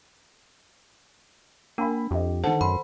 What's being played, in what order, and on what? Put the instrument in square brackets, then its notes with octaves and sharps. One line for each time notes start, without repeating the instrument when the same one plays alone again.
[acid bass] A#3 [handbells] D4 [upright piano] G5 G#5 B5
[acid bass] F2 [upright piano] G4 D#5
[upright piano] D3 D#3 [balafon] A4 F#5 A5 [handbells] C5
[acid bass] F#2 [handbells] B5 [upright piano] C6